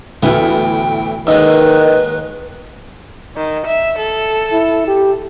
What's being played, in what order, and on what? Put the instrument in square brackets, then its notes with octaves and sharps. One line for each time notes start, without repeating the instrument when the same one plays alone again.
[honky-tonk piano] D2 A2 F6 [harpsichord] E3 A3 B3 [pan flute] G5
[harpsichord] D#2 G#2 G#3 [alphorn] D#3 [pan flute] B4 [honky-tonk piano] D#5 E6
[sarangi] D#3
E5
A4
[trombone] E4
G4